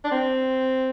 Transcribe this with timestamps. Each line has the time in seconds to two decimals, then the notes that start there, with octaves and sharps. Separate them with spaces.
0.04 D4
0.11 C4